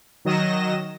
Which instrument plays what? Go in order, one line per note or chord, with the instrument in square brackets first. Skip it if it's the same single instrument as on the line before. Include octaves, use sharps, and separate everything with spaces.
[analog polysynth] D#3 F#3 D#5 A#6 E7